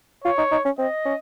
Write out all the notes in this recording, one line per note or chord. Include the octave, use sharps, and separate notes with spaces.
F4 C#5
D#4
D#4
C#4
C4 D#5
C#4